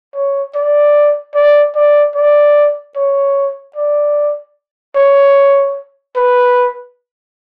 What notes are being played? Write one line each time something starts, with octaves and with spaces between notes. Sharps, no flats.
C#5
D5
D5
D5
D5
C#5
D5
C#5
B4